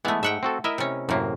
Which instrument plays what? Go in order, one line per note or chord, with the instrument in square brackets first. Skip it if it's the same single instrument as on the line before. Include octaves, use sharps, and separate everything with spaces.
[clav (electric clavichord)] E3 B3 [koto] G#3 A3
[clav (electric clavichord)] G#2 [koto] E5 F#5 G5
[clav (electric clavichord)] C4 F#4 A4
[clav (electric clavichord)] E4 A#4 D#5 [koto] E5
[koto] C3 C#4
[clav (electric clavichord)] F#2 A#3 [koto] A2 C3